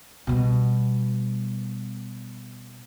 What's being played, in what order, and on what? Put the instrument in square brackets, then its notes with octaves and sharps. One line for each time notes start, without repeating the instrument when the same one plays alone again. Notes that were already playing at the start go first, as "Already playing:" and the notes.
[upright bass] B2 G3